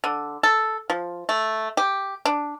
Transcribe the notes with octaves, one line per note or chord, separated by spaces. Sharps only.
D3
A4
F3
A3
G4
D4